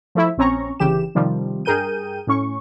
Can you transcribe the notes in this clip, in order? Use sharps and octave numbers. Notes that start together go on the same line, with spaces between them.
F3 A3 E4 E5
A#1 C4 C#4 A#5 C#6
G1 C#3 E3 G4 E7
C3 D#3 F3 G3
G2 G#4 A#4 G5 G6 D#7
A2 C#4 C#6